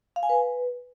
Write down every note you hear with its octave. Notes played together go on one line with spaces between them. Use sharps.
F5
G#5
B4